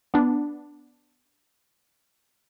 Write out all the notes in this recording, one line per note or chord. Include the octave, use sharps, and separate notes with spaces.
B3 D4